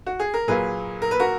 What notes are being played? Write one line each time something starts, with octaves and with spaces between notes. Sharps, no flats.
F#4
G#4
A#4
A#2 F#3 A#3 G#4 B4
A#4
B4
F#4 A#4